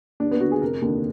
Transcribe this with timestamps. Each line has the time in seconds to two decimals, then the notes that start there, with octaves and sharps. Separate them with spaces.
0.20 D#2 D4
0.31 B3
0.41 D3 F#4
0.52 G#4
0.62 F1 A#4
0.82 D#2 D3